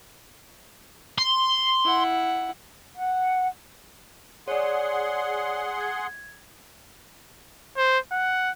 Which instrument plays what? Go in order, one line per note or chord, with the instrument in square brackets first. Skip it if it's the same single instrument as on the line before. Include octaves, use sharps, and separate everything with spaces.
[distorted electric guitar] C6
[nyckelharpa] E4 F#5
[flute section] F#5
[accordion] G#4 F#5 C6 [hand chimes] C#5 D5
[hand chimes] G#6
[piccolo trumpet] C5
F#5